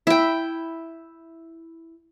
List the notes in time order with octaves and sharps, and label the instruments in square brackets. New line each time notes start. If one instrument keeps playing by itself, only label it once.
[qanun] E4 G5